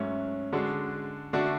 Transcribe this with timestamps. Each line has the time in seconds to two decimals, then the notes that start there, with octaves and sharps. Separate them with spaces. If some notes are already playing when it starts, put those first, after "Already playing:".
Already playing: G#2 F#3 A3 C#4
0.52 D3 G#3 D4 F#4
1.33 D3 A3 D4 F#4